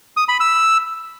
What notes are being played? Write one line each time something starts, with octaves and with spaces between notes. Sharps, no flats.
D#6
B5
E6